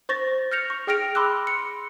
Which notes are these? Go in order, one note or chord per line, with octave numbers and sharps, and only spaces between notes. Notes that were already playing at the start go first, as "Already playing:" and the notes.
C5 C#6 A6 A#6
F6 G6 A#6 C#7 F7
C#6
G#4 G5 F6 A#6 D7 F7
B5 C6 D6 E6 F#6
C#7